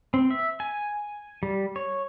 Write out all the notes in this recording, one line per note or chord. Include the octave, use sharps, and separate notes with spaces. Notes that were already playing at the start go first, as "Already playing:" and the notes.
C4
E5
G#5
G3
C#5